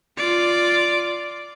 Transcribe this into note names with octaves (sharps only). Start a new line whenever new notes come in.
F4 D5